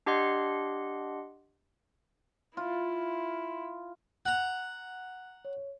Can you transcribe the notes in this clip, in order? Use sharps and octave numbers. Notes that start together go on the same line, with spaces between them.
D4 G4 D#5 F#5 C6
E4 F4
F#5 A#5 F#6
C#5